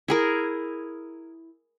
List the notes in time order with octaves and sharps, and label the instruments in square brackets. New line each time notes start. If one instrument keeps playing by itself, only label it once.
[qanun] E4 G#4 A#4